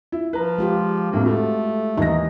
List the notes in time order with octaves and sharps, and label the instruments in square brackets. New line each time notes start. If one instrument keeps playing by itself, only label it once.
[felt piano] E4
[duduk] F3 [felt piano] B4 A#5
[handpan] G#3 F4 G4
[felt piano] F2 A2 D3 [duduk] A#3
[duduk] A3 [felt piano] F#4 A4
[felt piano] D#2 E3 A#6 [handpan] D#4